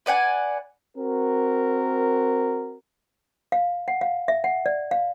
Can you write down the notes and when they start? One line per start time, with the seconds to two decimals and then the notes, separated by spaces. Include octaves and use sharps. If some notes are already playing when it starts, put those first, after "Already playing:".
0.06 B4 D5 F#5 G#5
0.97 C4 F#4 A#4
3.52 F5
3.88 F#5
4.01 F5
4.28 E5
4.44 F#5
4.66 D5
4.91 F5